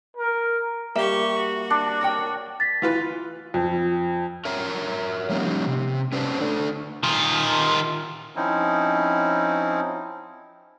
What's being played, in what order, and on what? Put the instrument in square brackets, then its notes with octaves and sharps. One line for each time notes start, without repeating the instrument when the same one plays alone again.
[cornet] A#4
[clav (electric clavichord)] G3 A#3 [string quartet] G4 C#6 [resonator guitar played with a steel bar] E5
[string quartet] F#4
[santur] D4 D5
[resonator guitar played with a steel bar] A#4 C#5 G5
[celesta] A6 B6
[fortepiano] E3 F4 B4
[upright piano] F2
[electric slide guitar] A#4 C#5 E5 A#5
F3 G3 A#3 C#4 D#4
C3
C#4 B4 C5 D5 A5
D3 A3 D4 A4 D5
[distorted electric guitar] D#3 F4
[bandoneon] F3 C4 C#4 D#4 E4